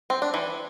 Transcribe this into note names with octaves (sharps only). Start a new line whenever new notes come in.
C4
D4
E3